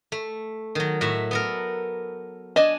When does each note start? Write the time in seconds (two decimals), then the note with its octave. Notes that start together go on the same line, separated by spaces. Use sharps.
0.12 A3
0.75 D#3 F#3
1.01 A2 F#4 E5
1.31 B3 A4 A#4
2.56 D4 D#5 G#5 A5